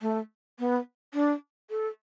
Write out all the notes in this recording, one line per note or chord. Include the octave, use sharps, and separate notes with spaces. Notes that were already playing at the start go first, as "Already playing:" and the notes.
A3
B3
D4
A4